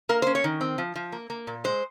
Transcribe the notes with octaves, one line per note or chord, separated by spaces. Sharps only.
A#3 A#4
C5
C#4
C#5
D#3
C4
F3
F3
A#3
A#3
A#2
G#3 C5